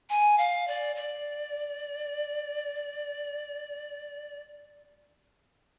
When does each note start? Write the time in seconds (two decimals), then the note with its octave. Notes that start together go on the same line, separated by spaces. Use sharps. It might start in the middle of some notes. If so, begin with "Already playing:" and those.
0.10 G#5
0.38 F5
0.67 D5
0.96 D5